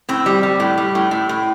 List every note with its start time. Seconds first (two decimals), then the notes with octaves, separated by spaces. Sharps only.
0.09 A2 C4
0.26 G3
0.43 G3
0.60 A2
0.78 G3
0.95 A2
1.11 A2
1.29 A2